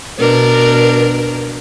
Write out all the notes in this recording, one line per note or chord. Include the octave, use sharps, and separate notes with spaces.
B2 D4 A#4